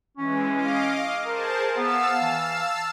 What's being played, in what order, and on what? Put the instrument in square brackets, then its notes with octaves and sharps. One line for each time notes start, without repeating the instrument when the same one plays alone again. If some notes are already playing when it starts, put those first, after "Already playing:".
[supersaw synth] E3 G#3 [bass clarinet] C#4
[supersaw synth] D#5 F5 D6
[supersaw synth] G#4 C5 A5 [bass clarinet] A#4
[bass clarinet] B3 [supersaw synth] F5 A5 E6
[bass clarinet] E3